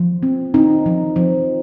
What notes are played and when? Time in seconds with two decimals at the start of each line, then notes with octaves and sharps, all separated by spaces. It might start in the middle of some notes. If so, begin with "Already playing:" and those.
Already playing: F3
0.23 C4
0.54 C4 D#4
0.86 F3
1.16 F3